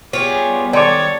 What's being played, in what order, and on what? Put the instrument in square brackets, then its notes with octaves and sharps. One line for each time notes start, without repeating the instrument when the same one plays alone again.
[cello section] G3 B3 [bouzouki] F4 C#5 [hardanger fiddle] G4 G#4
[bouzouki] D#3 [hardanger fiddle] A4 C#5 [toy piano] D5 C6 D6